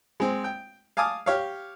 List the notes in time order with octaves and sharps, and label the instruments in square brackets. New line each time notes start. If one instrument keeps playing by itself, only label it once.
[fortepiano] G#3 C4
G5
F5 G#5 A5 D6 D#6
G4 C#5 F5